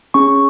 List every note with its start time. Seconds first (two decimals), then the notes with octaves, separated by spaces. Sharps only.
0.14 C#4 G#4 C#6